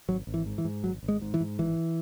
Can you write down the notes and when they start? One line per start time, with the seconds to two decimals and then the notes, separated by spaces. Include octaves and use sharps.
0.08 G#1 F#3
0.27 G#1
0.34 E3
0.46 G#2
0.58 E3
0.65 G#2
0.83 G#1 F#3
1.03 G#1
1.08 G#3
1.21 G#2
1.34 E3
1.40 G#2
1.58 G#1 E3